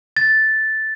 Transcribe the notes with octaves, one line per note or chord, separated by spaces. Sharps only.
A6